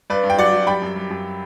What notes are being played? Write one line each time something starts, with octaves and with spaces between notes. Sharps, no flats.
G2 B4 D5
G2
G5
F#3 D5 F#5
F#3
G3 G5 B5
F#2
G3
F#2